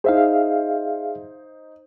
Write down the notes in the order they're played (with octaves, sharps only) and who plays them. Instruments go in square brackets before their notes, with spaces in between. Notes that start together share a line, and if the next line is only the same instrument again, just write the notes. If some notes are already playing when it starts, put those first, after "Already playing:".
[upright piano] D#4 C5 [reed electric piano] G#4 E5 F5